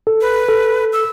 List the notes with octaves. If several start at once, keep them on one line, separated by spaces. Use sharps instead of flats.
A4
B4
A4
E6